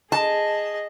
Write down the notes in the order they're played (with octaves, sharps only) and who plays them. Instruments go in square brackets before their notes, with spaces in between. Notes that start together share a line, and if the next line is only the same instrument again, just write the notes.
[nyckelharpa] G#4 D#5 [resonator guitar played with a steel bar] A5